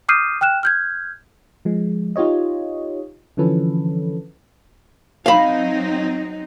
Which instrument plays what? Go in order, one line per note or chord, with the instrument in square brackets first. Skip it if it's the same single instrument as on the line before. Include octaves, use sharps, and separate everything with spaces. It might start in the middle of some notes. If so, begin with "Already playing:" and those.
[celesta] D6 D#6 F6 G6 C7 D#7
G5 F6 F#6 E7
F6 G6 G#6
[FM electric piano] F3 G#3
D#4 F4 G4 C#5 D#5
D3 E3 F3 C#4 A4 B4
[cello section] F#3 C4 D#4 [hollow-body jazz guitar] F5 B5